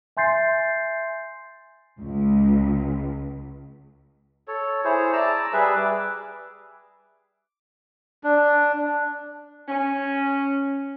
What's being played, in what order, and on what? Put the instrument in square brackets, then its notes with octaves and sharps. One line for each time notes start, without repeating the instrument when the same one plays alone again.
[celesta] E5 G#5 C6 G6 A6 C7
[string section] C#2
[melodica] A4 C#5
E4 G#4 C5 C#5
D5 A5 A#5 E6
G3 G#4 B4 E5
D6
D4
[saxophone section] C#4